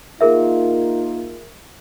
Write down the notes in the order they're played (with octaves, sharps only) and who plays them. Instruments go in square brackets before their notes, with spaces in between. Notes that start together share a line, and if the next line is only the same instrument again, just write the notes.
[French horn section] A#3 D#4 F4 [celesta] G#4 A#4 E5